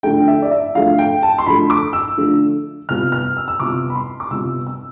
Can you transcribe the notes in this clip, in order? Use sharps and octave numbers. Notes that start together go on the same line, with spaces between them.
D3 F3 A3 G5
E5
D5
E5
D3 F3 A3 F5
G5
A5
C6
D3 F3 A3 B5
D6
E6
D3 F3 A3
C3 G3 B3 F4 F6
F6
E6
E6
C3 G3 B3 F4 D6
B5
C6
D6
C3 G3 B3 F4 E6
E6